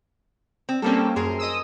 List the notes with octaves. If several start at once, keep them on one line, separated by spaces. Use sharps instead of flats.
C4
G3 A#3 C4 C#4 G4 A4
F#2 G#4 A#4 C5
D#5 D#6 E6